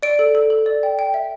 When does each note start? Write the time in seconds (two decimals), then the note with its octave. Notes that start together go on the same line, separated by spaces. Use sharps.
0.03 D5 D7
0.19 A4
0.35 A4
0.50 A4
0.66 D5
0.83 G5
0.99 G5
1.14 E5